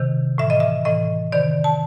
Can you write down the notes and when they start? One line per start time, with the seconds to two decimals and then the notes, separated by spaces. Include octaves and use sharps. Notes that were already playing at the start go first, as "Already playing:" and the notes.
Already playing: C3 D#3
0.38 A2 E3 E5
0.50 D#5
0.60 E5
0.85 A2 E3 D#5
1.32 C3 D#3 D5
1.64 A5